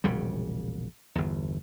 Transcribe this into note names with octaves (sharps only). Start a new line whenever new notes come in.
E1 A#1 C#3 G3
G1 E2